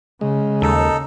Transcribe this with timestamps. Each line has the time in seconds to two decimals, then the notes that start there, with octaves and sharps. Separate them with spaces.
0.21 C#3 G#3
0.62 D#2 D#4 A4